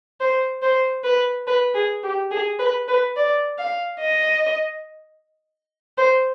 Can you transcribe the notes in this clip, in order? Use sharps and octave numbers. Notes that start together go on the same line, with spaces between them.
C5
C5
B4
B4
G#4
G4
G#4
B4
B4
D5
F5
D#5
C5